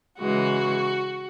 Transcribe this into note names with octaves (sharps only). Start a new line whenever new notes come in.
C#3 E3 G#3 F#4